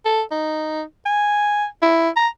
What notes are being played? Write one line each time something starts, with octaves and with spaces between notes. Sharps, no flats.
A4
D#4
G#5
E4
A#5